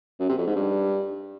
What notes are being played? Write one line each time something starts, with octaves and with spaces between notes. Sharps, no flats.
F#2
C3
F2
G#2
G2